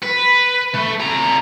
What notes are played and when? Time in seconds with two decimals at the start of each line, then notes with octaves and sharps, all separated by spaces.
0.03 B4
0.75 A3
1.00 F2 A#5